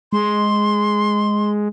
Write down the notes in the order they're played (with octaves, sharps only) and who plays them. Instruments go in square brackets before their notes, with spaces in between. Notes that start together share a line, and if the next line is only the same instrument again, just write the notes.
[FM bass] G#3 [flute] C6